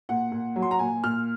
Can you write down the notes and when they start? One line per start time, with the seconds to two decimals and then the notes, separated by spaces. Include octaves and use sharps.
0.09 A#2 F#5
0.32 A#2
0.56 F#3
0.62 C6
0.71 A#5
0.79 A#2 G#5
1.03 A#2 F6